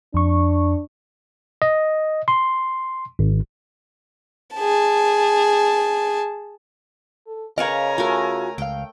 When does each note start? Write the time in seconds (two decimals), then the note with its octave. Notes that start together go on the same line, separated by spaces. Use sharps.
0.14 F2 D4 C#6
1.62 D#5
2.28 C6
3.19 G#1
4.55 G#4 A5
7.27 A4
7.58 C#3 A#4 B4 C#5 D#5 F5 G#5 A#5
7.98 A3 F4 F#4 A#4
8.58 C#2 F5 G5